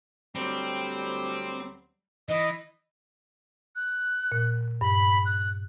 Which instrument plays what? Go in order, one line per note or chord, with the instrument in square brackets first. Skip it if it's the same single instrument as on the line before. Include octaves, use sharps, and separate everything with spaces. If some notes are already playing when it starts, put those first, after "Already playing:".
[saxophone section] D2 F#3 G3 [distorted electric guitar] C4
[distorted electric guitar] E3 [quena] D#5
[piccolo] F#6
[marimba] A#2
[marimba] G2 [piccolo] B5
[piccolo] F#6